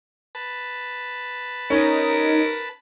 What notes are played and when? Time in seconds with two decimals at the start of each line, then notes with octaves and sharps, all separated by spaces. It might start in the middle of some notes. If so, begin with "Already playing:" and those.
0.35 B4 A5
1.70 C#4 D#4 A#4